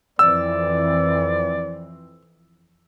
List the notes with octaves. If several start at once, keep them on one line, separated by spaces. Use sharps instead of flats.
F2 E3 C4 D5 E6